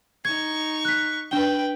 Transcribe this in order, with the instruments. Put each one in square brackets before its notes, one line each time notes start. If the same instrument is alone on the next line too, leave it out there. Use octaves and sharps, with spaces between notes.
[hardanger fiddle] D#4 C#6 [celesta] G#6
[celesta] F#6 B6
[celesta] D4 G7 [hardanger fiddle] B4 G5